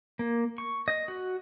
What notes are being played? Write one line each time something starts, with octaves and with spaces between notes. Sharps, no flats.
A#3
C#6
D#5
F#4